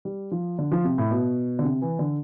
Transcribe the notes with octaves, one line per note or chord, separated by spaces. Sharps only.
G3
F3
D3
F3
C3
A2
B2
D3
C3
E3
D3